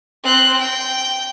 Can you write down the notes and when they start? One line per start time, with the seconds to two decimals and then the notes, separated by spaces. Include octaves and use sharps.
0.23 C4 F#6
0.59 G5